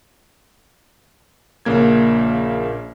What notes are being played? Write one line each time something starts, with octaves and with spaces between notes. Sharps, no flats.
A#1 C#3 A#3 G#6